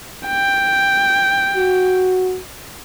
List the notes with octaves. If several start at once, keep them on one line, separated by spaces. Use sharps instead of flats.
G5
F#4